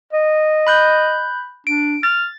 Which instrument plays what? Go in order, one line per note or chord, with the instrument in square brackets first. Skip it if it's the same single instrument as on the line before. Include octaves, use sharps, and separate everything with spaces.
[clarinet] D#5
[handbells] B5 F#6 G6
[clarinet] D4 [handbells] D7
[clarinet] F6 [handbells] A6